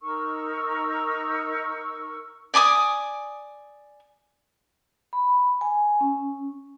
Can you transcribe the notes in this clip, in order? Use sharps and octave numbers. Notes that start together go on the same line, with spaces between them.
D#4 A#4 C#6 E6
D5 G#5 D6 D#6
B5
G#5
C#4